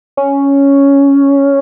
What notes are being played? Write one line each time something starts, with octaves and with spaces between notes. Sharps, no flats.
C#4